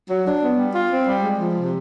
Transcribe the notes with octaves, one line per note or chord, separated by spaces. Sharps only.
F#3
D4
B3
G3
F4
C4
G3
G#3
F3
C3